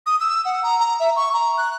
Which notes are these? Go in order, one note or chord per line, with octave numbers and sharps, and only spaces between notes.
D#6
E6
F#5
A#5
A#5
E5
C#6
A#5
F#6